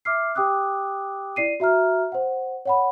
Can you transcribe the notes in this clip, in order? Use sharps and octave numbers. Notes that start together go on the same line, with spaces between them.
E5 D6 F6 C7
G4 G5 D6 D#6 F#6
E4 D5 C7 D#7
F#4 E5 A#5 F6
C5 F#5
C#5 F#5 B5